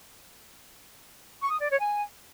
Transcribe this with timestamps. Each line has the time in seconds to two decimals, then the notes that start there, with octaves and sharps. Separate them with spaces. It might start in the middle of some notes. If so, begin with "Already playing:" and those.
1.41 C#6
1.50 D#6
1.60 D5
1.70 C#5
1.79 G#5